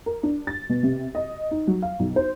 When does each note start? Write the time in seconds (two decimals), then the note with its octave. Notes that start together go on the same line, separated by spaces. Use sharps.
0.06 A#4
0.23 D4
0.47 A6
0.69 B2
0.83 C3
1.15 D#5
1.51 D#4
1.67 F#3
1.82 F5
1.99 B1
2.16 C5